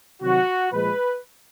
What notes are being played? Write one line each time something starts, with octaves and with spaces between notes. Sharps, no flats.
C3 D#3 F#3 F#4
A#2 F3 G#3 B4